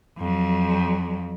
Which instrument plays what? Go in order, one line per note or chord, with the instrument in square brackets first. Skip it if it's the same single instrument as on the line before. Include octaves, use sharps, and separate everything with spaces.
[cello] F2 F#3